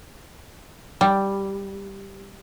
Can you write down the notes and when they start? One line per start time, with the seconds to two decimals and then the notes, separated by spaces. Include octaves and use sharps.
1.01 G3